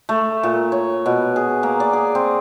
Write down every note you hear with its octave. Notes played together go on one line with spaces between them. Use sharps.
A3
A#2
C#5
B2
G#4
A#3
D5
G#4
C4